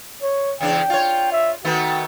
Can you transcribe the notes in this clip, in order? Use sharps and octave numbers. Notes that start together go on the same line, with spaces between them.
C#5
E2 C#3 D4 G5
F4 C#5
E5
D#3 A3 B3 F#4